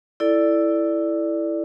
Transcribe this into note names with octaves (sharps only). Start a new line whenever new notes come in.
E4 A4 D5